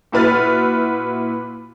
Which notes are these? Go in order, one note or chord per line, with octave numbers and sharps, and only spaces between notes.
A#2 E4 F#4 B4 F6 A6